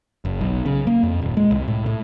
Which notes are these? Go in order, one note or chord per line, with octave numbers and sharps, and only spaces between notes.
F#1
B1
C#3
A#3
F2
D#1
G#3
C2
A2
A2